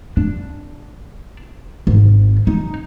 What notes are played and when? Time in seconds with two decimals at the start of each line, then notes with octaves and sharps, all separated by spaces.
0.17 D4
1.87 G#1
2.47 D#4